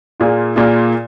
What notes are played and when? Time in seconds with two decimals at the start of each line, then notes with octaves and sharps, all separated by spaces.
0.20 A#2 A#3 F4 G#4
0.56 A#2 A#3 F4 G#4